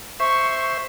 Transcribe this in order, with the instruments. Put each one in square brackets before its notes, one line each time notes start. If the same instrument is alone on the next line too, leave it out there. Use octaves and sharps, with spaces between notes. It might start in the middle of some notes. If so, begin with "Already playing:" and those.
[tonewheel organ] C5 E5 [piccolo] C#6